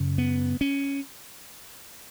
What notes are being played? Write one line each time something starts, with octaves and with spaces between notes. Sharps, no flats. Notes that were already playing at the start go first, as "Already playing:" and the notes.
Already playing: F#2 C#3
B3
C#4